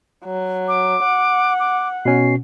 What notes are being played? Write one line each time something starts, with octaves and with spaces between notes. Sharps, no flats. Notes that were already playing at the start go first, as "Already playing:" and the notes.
F#3
D6
F#5
D6
B2 C#4 C7